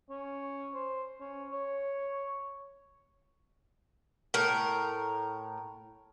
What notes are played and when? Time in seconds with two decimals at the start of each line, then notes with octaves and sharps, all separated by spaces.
0.10 C#4
0.74 C5
1.20 C#4
1.52 C#5
4.34 A2 A#4